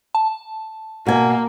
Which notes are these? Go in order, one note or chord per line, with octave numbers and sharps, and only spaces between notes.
A5
B2 A#3 G#5